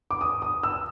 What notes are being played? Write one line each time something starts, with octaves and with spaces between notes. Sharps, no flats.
D6
D#6
D#6
E6